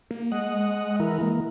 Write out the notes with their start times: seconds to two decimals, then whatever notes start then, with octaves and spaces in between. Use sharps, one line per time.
0.11 A#3
0.32 G#3 D#5 F#5
1.00 E3 E4 A#4
1.21 E3 A#3